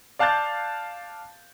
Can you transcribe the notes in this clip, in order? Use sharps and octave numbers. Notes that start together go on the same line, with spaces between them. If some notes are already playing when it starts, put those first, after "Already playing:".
D5 F5 A5 F#6 G6 A6